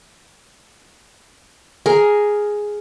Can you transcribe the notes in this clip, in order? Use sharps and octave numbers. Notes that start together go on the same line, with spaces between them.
G#4 A#4